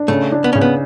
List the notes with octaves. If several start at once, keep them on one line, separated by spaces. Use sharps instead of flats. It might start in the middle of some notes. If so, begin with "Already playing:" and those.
Already playing: D4
C#3 A3
D4
B3
C#3 C#4
B3